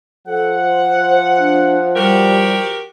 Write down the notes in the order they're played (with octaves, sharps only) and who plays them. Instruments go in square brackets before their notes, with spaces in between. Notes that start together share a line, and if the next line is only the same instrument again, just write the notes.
[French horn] F3 [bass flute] A4 [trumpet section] F#5
[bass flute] C5
D4
[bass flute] G3 [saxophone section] F#4 G4 A#4